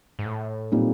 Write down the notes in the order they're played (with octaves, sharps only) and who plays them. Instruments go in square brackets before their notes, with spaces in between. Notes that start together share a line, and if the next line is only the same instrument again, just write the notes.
[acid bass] G#2
A2
[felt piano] A#2 G3 C4 D#4